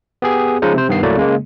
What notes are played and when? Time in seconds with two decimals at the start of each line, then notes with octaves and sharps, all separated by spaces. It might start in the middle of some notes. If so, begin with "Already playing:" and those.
0.22 B3 G4 G#4
0.62 C#3 F3 G#3 C#4 D#4
0.74 C3 C5
0.89 G2 D#3 B3 C7
1.03 C2 F#3 A3 A#3 E4 D5
1.17 C#3 G#3 A#3